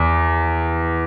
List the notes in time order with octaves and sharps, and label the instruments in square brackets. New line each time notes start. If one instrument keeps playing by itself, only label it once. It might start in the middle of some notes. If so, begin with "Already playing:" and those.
Already playing: [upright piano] E2